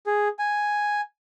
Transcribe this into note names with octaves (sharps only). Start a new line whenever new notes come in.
G#4
G#5